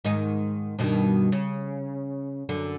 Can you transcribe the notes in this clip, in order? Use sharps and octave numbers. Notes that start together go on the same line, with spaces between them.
G#2 D#3 D#4
G2 B2 D#3
C#3
F#2 D3